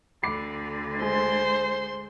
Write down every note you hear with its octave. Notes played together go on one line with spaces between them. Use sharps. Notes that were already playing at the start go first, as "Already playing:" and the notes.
D2 D3 B5 D6 C7
G#3 C5 C6